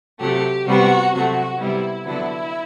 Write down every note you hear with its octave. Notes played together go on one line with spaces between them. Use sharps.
C3 F#3 A3 G4
C3 G3 B3 F#4
C3 F#3 A3 F#4
C3 G3 B3 E4
D3 F#3 B3 E4